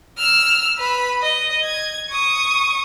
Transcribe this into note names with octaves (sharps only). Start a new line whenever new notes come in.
E6 F6
B4 B5
D#5
G#6
C#6 D#6